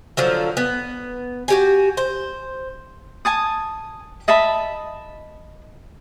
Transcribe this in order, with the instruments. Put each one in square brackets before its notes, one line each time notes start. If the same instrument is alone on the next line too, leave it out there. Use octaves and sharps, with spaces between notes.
[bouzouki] D3 F3 F#3
B3
F#4 G4 G#5
C5
[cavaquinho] G#5 A5 D#6
D#5 E5 A5 B5